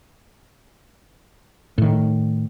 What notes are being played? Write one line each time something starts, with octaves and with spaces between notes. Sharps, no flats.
A2 D#3